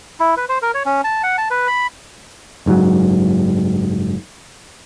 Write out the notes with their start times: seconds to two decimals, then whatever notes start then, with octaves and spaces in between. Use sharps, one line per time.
0.20 E4
0.37 B4
0.49 C5
0.62 A#4
0.74 C#5
0.86 C#4
1.04 A5
1.23 F#5
1.38 A5
1.51 B4
1.67 B5
2.66 F#1 G#2 C3 F#3